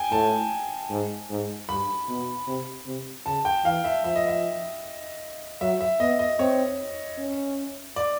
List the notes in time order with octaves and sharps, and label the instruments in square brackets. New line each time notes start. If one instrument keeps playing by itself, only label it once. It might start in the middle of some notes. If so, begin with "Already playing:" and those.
Already playing: [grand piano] G5 G#5
[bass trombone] A2 [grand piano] A5
[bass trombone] G#2
G#2
[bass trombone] G2 [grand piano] B5
[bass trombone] B2
C3
C3
[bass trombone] C#3 [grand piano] A5
[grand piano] G5
[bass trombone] E3 [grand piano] F5
[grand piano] E5
[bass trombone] F3 [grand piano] E5
[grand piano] D#5
E5
[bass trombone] F#3 [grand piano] E5
[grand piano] E5
[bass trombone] B3 [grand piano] D#5
[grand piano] D#5
[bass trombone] C4 [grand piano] C#5
[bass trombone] C#4
[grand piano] D5